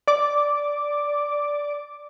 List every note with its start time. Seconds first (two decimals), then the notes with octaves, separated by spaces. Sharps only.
0.08 D5 D6